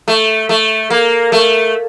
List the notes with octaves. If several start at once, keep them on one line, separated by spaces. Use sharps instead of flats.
A3
A3
A#3
A3